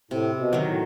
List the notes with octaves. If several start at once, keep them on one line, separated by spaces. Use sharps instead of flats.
A2 C3
B2
D#3 F#3
A2